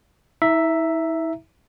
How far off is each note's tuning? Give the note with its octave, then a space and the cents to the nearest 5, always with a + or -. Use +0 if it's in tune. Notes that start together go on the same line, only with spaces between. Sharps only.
E4 -40 E5 +0 A#5 +0